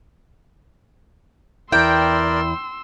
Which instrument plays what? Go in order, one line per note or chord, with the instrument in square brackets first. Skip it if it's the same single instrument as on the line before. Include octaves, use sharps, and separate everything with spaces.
[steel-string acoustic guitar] E2 E4 [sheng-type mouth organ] A#4 D5 [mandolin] G5 [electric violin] C6 E6